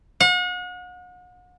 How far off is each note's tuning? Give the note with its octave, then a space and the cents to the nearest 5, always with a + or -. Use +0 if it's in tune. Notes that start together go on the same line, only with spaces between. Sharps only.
F#5 -40